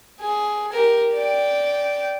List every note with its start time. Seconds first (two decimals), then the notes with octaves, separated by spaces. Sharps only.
0.20 G#4
0.72 G4 A#4
1.14 D5 G5